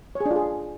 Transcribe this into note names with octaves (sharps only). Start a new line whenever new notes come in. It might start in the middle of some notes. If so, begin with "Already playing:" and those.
C#5
G#4
D4
F4
G#4